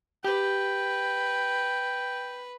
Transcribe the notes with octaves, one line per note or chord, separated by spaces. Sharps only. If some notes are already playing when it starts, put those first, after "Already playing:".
G4 B4 G5